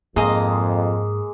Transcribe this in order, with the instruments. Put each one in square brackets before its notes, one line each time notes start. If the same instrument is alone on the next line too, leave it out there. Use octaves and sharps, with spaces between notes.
[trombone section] F2 [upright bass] G#2 [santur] G#3 [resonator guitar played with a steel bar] A#3 D#5